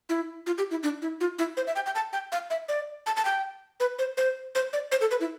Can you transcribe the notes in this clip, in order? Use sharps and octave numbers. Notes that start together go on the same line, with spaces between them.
E4
F4
G4
E4
D4
E4
F4
E4
C5
E5
G5
G5
A5
G5
F5
E5
D5
A5
A5
G5
B4
C5
C5
C5
D5
C5
A4
B4
E4